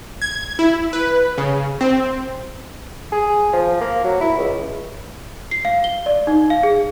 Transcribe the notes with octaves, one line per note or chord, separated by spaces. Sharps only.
G#6
E4
B4
C#3
C4
G#4
F3
A#3
F#3
E4
C#2
C7
F5
G7
D5
D#4
F5
G#4